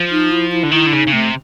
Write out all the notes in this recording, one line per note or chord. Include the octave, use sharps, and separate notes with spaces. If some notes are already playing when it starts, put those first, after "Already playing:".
Already playing: F3
D#4
E4
E4
D3
D#3 E4
D3
C#3 D#4
C#3
C3 A3